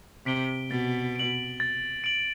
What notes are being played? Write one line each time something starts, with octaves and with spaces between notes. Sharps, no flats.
C3 B6 D7 G7
B2 A6
D7 F#7
A6
D7 F#7